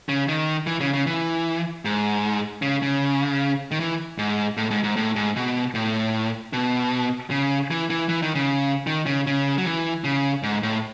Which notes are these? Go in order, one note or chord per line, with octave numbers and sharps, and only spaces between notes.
C#3
D#3
E3
C#3
C#3
E3
G#2
C#3
C#3
D#3
E3
G#2
A2
G#2
G#2
A2
G#2
B2
A2
B2
C#3
E3
E3
E3
D#3
C#3
D#3
C#3
C#3
F#3
E3
C#3
G#2
A2